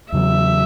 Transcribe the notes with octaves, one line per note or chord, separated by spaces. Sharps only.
E2 C#3 F#3 E5